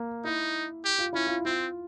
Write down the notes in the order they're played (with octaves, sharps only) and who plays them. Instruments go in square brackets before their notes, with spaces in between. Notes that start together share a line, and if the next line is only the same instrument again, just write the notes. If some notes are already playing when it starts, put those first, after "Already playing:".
Already playing: [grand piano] A#3
[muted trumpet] D#4 [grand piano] E4
[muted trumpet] G4
[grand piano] F4
[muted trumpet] C#4 [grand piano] E4
[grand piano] F4
[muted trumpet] C4 [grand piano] F4